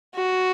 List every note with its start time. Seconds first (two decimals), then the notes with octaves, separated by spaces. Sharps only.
0.15 F#4